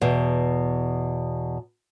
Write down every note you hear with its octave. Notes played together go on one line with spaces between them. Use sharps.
E2 B2